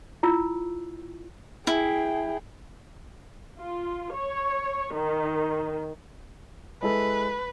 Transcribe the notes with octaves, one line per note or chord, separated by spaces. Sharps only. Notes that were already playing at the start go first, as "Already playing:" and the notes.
E4 F4 E6
E4 G#4 G5
F4
C#5
D#3
G#3 E4 A4 B4